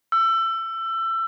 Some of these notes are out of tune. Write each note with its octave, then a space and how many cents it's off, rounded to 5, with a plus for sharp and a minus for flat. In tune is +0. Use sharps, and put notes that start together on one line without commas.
E6 +25